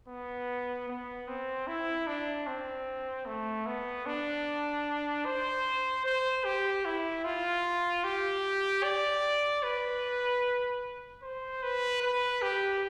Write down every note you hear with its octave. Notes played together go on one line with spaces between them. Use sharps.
B3
B3
C4
E4
D4
C4
A3
B3
D4
C5
C5
G4
E4
F4
G4
D5
B4
C5
B4
B4
G4